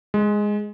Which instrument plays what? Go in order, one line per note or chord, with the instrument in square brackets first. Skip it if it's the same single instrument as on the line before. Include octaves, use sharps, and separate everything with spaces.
[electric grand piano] G#3